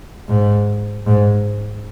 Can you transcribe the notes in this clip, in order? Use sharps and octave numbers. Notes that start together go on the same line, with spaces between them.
G#2
G#2